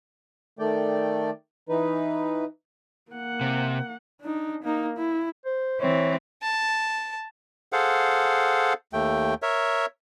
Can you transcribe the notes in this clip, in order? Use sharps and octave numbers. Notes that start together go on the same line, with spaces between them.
D#3 A3 D5 G5
E3 D#4 B4
A#3 F#5
C3
D4 D#4
A#3 D#4
E4
C5
E3 C4 C#5
A5
G#4 A4 C5 F5 F#5
D#2 A3 G5
A#4 C#5 E5